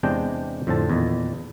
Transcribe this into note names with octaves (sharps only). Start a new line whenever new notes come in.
E2 C3 G#3 D4 G5
F2 A2 D3 C4 A5
E2 A#2 D#3